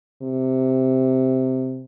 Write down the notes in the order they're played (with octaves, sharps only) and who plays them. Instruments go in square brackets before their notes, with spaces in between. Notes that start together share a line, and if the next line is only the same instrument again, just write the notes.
[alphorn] C3